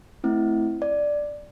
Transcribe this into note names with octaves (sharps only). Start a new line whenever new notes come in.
A3 C4 E4
D5